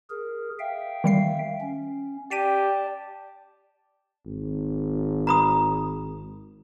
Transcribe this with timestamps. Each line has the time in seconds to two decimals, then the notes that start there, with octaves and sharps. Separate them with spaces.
0.10 G#4 A#4
0.59 E5 F5 G5
1.04 D#3 G3 C7
1.60 C#4
2.31 G4 D5 A5 B6 D7 D#7
4.26 G#1
5.27 A#5 B5 D#6